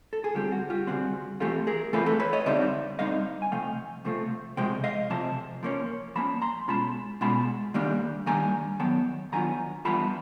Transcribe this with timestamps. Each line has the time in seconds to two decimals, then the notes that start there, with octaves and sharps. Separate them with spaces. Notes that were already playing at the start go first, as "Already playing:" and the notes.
0.13 A4
0.24 G#4
0.35 D3 G3 C4 F4 G4
0.52 F#4
0.70 F4 G4
0.87 D3 G3 C4 F#4 G#4
1.40 E3 A3 C4 F4 G4 A4
1.67 G#4 A#4
1.93 E3 A3 C4 F4 A4 B4
2.06 A4 B4
2.20 B4 C#5
2.33 C#5 D#5
2.46 D3 G3 C4 D#4 D5 E5
2.99 D3 G3 C4 D#4 D#5 F5
3.42 G#5
3.52 C3 F3 A3 F5 G5
4.05 C3 F3 A3 C4 F4
4.57 C3 F3 G#3 G5
4.84 D#5 F5
5.10 C3 F3 A5
5.63 F3 A#3 C#4
6.15 F3 A#3 C#4 A5 B5
6.42 A#5 C6
6.68 B2 G#3 C#4 F4 A5 B5
7.21 B2 G#3 C#4 F4 A5 B5
7.74 D#3 G3 A#3 D4
8.26 D#3 G3 A#3 D4 G#5 A#5
8.79 D#3 F#3 B3 G5 A5
9.32 D#3 F#3 B3 D4 F4 G#5 A#5
9.85 E3 G3 B3 D4 F4 A5 B5